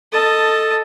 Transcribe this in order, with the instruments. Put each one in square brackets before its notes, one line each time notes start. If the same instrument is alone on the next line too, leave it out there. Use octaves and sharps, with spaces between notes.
[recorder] A4 [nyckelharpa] D#5 A5